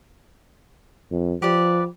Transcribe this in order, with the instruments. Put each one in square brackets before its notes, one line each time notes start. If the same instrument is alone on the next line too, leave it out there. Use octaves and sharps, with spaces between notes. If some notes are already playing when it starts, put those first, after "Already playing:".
[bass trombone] F2
[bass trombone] F3 [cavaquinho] G4 B4 D5